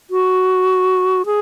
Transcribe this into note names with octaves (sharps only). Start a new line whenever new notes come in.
F#4
G#4